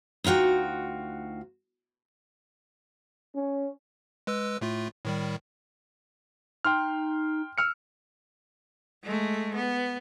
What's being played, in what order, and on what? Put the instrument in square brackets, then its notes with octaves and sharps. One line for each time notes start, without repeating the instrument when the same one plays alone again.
[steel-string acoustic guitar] D2 D#4 F4 F#4 G5
[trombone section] C#4
[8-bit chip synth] G#3 B4 E6
A2 A3 F4
A2 D#3 G3
[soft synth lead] D#4 [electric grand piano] G5 C6 F6
[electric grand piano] E6 F6 C#7
[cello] G#3 A3
B3